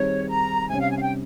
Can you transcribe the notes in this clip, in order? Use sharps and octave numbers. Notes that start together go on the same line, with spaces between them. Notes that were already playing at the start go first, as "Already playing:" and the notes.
Already playing: D#3 G3 C4 D#4 G#4 C#5
A#5
C3 G3 C#4 G#5
F5
G#5
F5
G5